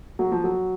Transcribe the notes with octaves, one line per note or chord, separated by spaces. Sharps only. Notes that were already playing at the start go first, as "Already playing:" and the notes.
F#3
F3
F#3